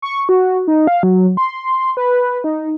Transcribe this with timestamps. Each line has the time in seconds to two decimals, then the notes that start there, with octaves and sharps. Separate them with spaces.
0.02 C#6
0.29 F#4
0.68 D#4
0.87 F5
1.03 F#3
1.37 C6
1.97 B4
2.44 D#4